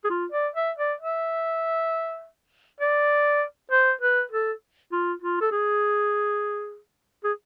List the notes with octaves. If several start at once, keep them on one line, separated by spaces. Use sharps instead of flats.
G#4
F4
D5
E5
D5
E5
D5
C5
B4
A4
F4
F4
A4
G#4
G#4